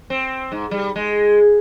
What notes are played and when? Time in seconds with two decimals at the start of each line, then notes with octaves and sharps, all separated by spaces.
0.10 C4
0.52 G#2
0.71 G3
0.96 G#3